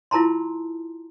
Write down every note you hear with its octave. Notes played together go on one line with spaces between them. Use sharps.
E4 F4 A#4 A5 A#5 C6